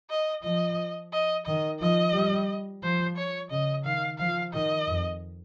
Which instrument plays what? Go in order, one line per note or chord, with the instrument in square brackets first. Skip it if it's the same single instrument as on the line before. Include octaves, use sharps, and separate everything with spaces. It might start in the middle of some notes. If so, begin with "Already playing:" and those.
[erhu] D#5
[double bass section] F3 [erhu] D#5
[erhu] D#5
[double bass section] D#3 [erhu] D#5
[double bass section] F3 [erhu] D#5
[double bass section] G3
[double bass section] F3 [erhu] C5
[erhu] C#5
[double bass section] C#3 [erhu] D#5
[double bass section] D#3 [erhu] F5
[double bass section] F3 [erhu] F5
[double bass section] D#3 [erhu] D#5
[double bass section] F2